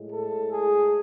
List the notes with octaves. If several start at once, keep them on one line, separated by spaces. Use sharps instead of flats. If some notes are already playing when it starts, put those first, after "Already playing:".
Already playing: A2 G#3
A4
G#4